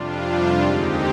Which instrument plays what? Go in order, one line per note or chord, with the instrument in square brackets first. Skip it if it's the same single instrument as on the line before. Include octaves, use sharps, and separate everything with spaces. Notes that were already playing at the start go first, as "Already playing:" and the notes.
Already playing: [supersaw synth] F2 C3 G3 D4 F4
D#2 D3 G#3 C4 D#4 G4